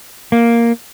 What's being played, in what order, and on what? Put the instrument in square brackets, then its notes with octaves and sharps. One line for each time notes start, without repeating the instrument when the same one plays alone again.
[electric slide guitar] A#3